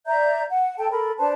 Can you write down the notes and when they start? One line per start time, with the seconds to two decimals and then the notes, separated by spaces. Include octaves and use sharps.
0.06 D5 E5 A#5 G6
0.49 F#5
0.78 A4 G5 A5
0.91 A4 A#4 B5
1.18 D4 B4 C5 A5